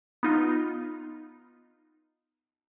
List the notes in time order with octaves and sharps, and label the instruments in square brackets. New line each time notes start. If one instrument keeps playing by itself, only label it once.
[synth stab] B3 D#4 F4